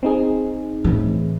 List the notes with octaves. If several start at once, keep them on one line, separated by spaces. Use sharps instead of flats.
C4 D#4 G#4
A2 E3